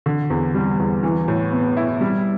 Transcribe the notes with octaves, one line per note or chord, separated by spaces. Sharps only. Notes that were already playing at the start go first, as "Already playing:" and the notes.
D3
E2
G3
E2
E3
A2
B3
E4
G3